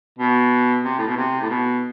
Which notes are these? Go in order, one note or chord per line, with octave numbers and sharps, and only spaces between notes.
B2
C3
A2
B2
C3
A2
B2